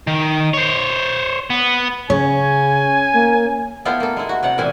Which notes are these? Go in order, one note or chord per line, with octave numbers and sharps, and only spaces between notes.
D#3
C5 C#5
B3
C#3 C#4 C#5 G#5
A#3
B3 E4 F4 G4 A4
A#3 A4
G#3 E4
F#4
C3 D5 F#5
A#2 E3 G3 C4 E4 G#5